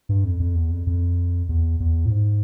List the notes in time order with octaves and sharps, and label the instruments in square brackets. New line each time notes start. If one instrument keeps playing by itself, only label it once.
[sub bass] G2
F2
F2
E2
F2
F2
E2
E2
A2
G#2